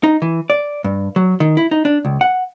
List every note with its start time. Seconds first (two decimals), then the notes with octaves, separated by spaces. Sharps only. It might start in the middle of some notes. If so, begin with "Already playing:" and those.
0.04 D#4
0.22 E3
0.50 D5
0.84 G2
1.16 F#3
1.40 D#3
1.57 E4
1.71 D#4
1.85 D4
2.05 C#2
2.21 F#5